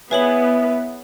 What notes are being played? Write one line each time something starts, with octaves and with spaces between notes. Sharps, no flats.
B3 E4 G#4 B4 C#5 F#7